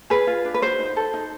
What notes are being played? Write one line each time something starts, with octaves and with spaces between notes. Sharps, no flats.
G#4 B4
F4
D4
B4
F#4 C5
D#4
A4
D#4